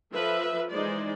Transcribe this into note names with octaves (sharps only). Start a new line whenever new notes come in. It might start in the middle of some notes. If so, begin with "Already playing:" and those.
F3 A4 B4 E5
E3 G#3 D#4 C5 D5